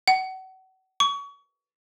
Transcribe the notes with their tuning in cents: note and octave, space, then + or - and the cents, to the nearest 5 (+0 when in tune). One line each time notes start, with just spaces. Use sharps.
F#5 +35
C#6 +30